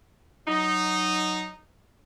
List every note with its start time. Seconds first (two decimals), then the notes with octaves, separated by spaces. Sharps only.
0.48 F#3 D#4